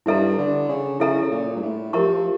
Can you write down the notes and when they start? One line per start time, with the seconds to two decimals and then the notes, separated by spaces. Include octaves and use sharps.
0.06 G2 E4 A4 E5 A#5
0.38 D3
0.69 C#3
1.00 C#3 E4 A4 E5 A#5
1.22 C#3
1.31 A#2
1.56 G2
1.62 A2
1.93 F3 G4 A#4 E5 A#5 C#6